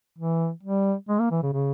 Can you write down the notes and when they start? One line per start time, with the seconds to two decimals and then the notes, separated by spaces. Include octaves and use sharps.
0.19 E3
0.63 G3
1.09 G#3
1.19 A#3
1.31 E3
1.43 C#3
1.53 C#3